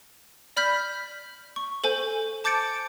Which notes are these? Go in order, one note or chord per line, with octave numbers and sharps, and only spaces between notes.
D5 B5 F6 G6 B6
C#6
A4 C5 G#5 G6
A5 D6 G6 A6 C#7 D7